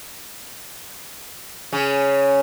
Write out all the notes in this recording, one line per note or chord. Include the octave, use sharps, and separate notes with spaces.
C#3 C#4